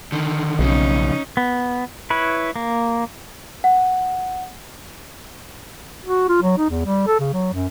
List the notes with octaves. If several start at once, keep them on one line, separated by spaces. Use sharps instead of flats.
D3 D#3
B1 F2 C#3 C#4 D#4
B3
E4 B4 C#5
A#3
F#5
F#4
F4
F#3
D#4
E2
G3
A4
C#3
F#3
F#2